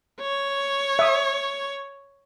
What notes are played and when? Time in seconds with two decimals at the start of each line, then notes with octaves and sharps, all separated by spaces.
0.21 C#5
0.99 E5 D#6